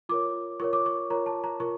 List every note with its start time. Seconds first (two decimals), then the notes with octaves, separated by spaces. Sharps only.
0.09 F4 A#4 C#5 D6
0.60 F4 A#4 C#5 C#6
0.73 D6
0.86 C#6
1.10 F4 A#4 C#5 A#5
1.26 A5
1.44 A#5
1.60 F4 A#4 C#6